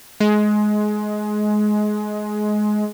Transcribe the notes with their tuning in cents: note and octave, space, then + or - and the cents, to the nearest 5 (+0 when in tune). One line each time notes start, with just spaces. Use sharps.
G#3 +20